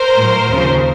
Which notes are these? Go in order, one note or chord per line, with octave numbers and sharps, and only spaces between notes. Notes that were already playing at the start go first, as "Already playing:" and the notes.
Already playing: A#4 C5
A2 F#3
D#2 C#3 F3